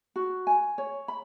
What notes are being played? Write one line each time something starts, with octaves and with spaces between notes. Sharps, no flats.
F#4
G#5
C#5
B5